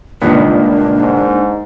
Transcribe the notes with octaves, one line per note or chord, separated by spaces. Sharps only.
C#2 G2 A#2 D#3 A#3 B3 D4
G#2